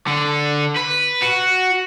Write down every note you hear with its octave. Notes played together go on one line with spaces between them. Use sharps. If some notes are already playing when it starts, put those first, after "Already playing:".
D3
B4
F#4